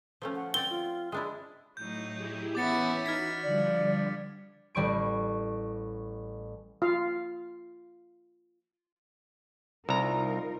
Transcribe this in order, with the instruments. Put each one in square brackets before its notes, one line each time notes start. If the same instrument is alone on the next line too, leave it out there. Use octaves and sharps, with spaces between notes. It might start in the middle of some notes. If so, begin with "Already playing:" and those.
[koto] F3 A3 C#4
[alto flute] F#5
[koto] C4 D5 G5 [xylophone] G7
[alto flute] F4
[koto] G#3 D4 E4 [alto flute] E5
[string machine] A2 [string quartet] F#3 D#4 [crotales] G6
[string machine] E4 G4 G#4
[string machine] E3 B6 [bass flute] B3 [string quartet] C#4 E4 [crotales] D6 A6 C#7
[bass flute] D#4 [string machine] F#4 [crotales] F6 G#6 B6
[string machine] D3 G3 [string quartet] F3 [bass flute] D5
[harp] A1 G3 C#6 D7
[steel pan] F4 F5
[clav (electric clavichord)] C2 A#5 [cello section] D#4 F4 A#4